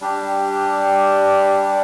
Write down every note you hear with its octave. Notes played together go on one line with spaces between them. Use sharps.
G3 D4 G4